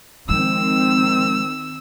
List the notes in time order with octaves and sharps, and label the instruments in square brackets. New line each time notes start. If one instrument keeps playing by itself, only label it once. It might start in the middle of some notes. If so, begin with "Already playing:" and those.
[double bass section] D#3 C4 [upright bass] F3 G#3 [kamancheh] E6